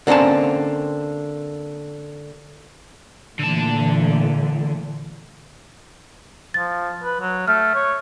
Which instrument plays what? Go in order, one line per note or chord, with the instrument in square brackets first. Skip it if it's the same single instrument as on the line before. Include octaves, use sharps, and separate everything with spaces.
[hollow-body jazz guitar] D3 A#3 C4 C#4 A5
[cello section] A#2 E3 A3 [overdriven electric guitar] D3 A5
[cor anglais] F3 [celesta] A6
[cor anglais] B4
F#3
[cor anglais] A3 [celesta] F6
[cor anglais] C#5